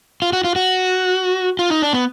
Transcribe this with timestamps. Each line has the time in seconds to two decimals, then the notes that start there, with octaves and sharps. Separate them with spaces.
0.22 F4
0.33 F#4
0.44 F4
0.56 F#4
1.59 F4
1.70 D#4
1.82 D4
1.93 B3